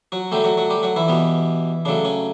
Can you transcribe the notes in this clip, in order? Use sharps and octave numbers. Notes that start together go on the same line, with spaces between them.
F#3 F#4
D3 F#3 G3 A3 G4
F#3 F#4
F#3 F#4
G3 G4
F#3 F#4
E3 E4
B2 G3 B3
C#3 F#3 A3 D4
C#4